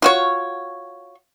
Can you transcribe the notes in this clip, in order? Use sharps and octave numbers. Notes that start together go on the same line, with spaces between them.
F4 F#4 C#5